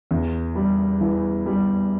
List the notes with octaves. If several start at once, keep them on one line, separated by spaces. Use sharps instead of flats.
E2
G3
E3
G3